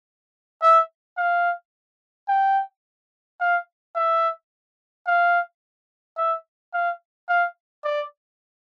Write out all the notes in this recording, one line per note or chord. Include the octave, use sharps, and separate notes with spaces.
E5
F5
G5
F5
E5
F5
E5
F5
F5
D5